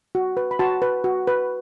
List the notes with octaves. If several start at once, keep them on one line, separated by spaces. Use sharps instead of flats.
F#4
B4
B5
F#4 A5 C6
B4
F#4
B4